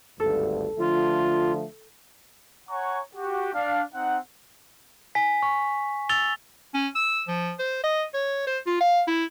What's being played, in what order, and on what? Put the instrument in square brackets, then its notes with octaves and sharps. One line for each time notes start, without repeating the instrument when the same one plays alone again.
[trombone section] G#1 D2 G2 [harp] A4
[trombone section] D3 F3 A3 [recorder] F4
[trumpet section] C#5 F#5 G#5 A#5 C#6
F#4 G4
D4 F5
C4 D#4 F#5
[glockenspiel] G#5 B6
C#6
E6 A6 F7 G7
[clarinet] C#4
E6
F3
C5
D#5
C#5
C5
F4
F5
E4